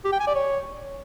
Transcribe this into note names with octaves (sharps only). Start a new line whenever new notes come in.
G4
G5
G#5
D5
C#5